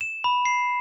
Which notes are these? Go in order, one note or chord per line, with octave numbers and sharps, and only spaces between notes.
E7
B5
C7